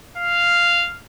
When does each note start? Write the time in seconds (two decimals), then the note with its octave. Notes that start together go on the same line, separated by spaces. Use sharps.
0.18 F5